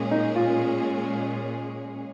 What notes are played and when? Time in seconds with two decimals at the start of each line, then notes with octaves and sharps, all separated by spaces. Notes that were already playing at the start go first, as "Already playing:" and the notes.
Already playing: A#2 G#3 C#4 G#4
0.11 D#4
0.36 F4